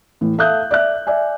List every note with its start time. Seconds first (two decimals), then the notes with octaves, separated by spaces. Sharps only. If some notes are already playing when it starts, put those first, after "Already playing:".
0.21 A2 E3
0.38 A4 E5 F5 D#6 F#6 G6
0.71 D5 E5 F#6
1.07 D5 E5 G#5